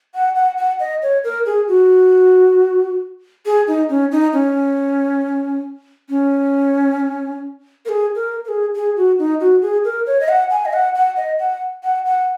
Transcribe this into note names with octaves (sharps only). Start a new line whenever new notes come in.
F#5
F#5
F#5
D#5
C#5
A#4
G#4
F#4
G#4
D#4
C#4
D#4
C#4
C#4
A#4
G#4
A#4
A#4
G#4
G#4
F#4
D#4
F#4
G#4
A#4
C#5
D#5
F#5
G#5
D#5
F#5
F#5
D#5
F#5
F#5
F#5